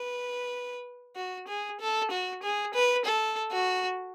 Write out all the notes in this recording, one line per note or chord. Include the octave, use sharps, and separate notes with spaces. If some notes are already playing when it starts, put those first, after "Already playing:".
Already playing: B4
F#4
G#4
A4
F#4
G#4
B4
A4
F#4